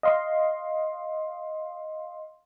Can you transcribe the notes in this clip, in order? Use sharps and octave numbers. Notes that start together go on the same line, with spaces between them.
D#5 F5 C6